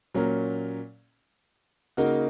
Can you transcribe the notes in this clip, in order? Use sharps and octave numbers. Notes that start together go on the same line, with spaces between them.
A#2 F#3 C#4 A#4
C#3 A#3 D#4 F#4 A#4